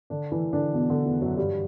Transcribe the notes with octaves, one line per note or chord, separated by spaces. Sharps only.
D3 D4
E3 E4
D3 D4
B2 B3
D3
E2 E3
F#2 F#3
G2 G3